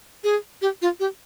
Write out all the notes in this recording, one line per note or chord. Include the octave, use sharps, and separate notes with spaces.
G#4
G4
F4
G4